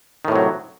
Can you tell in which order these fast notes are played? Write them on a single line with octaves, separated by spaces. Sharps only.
D#3 A2 C3 F#3